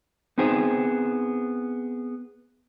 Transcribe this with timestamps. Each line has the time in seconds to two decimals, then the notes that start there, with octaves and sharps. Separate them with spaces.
0.38 B3 C4 D#4 G#4 B4 C5